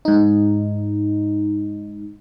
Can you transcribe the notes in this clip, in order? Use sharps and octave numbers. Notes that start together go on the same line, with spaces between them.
G#2 D#4